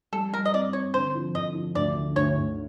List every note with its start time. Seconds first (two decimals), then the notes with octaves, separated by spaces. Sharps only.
0.12 G3 A4
0.33 G3 A#4
0.45 D#5
0.54 C4 D5
0.73 C4 C#5
0.94 D3 C5
1.15 F3
1.35 D3 D#5
1.55 F3
1.75 D2 D5
1.96 D3
2.16 D2 C#5
2.37 D2